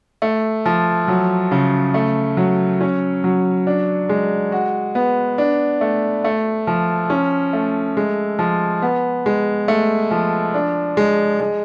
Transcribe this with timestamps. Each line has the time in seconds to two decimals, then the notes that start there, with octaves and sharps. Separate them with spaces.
0.22 A3
0.66 F3
1.08 F#3
1.51 C#3
1.94 A3
2.37 F#3
2.81 C#4
3.24 F#3
3.67 D4
4.09 G#3
4.52 F#4
4.95 B3
5.38 D4
5.81 A3
6.24 A3
6.67 F3
7.10 C#4
7.53 A3
7.97 G#3
8.39 F3
8.82 B3
9.26 G#3
9.68 A3
10.11 F3
10.54 D4
10.97 G#3
11.40 G#3